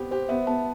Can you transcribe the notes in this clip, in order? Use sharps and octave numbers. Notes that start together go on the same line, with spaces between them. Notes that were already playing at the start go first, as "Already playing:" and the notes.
Already playing: B3 C4 G4
G4 C5
B3 E5
B3 A5